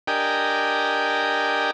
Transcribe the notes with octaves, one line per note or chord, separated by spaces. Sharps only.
D4 G4 A#4 D#5 G5 G#5